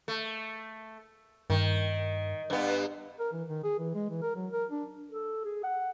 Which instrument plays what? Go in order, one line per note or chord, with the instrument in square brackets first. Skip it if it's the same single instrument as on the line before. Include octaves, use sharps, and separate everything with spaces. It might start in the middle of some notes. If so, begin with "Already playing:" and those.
[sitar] A3
[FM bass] G2 [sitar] D#3
[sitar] G2 B3
[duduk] A#4
E3
D#3
G#4
E3
G#3
E3
A#4
F#3
A#4
D4
[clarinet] A4
G#4
F#5